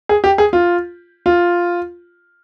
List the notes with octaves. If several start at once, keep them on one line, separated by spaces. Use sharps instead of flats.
G#4
G4
G#4
F4
F4